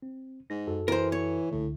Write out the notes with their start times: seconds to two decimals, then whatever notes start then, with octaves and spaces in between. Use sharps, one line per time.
0.02 C4
0.50 G#2 A#6
0.67 F#2 F#4 A4
0.88 E3 A#4 C5
1.12 C#5
1.51 C#2 A2 D3